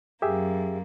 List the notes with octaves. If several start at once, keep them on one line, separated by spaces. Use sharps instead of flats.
F#2 A#3 G4 G#4 E5